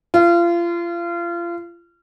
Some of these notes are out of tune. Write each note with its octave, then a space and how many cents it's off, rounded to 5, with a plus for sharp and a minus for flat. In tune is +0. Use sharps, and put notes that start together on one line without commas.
F4 -30